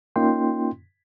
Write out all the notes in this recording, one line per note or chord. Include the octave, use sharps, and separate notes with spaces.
A#3 C#4 D#4 F4 G5 C6